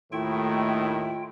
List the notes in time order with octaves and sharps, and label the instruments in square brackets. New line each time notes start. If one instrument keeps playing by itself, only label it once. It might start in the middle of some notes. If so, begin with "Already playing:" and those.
[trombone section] D#2 A2 D#3 [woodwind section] A3 [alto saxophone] E4 [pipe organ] F4 G5